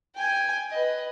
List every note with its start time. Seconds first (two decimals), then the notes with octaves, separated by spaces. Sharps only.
0.16 G5 G#5
0.71 B4 D#5